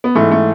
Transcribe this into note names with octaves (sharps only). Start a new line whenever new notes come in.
B3
G#2 E3 A3
A3